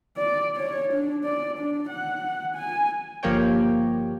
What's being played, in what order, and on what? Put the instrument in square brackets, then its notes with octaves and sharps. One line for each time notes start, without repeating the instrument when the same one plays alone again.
[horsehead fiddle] D5
C#5
D4
D5
D4
F#5
G#5
[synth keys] G1 F3 A#3 G4 C#5 G5